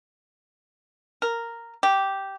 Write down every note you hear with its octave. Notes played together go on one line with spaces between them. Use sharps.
A#4
G4